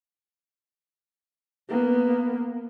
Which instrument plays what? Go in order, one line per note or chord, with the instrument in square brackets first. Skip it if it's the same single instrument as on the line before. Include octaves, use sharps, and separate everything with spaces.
[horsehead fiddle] A#3 B3